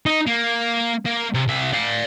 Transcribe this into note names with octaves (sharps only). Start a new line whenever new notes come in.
D#4
A#3
A#3
C3
C2 E5
D5 F5